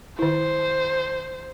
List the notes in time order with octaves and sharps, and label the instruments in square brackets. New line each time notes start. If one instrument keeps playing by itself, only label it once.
[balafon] D#3 E4 [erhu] C5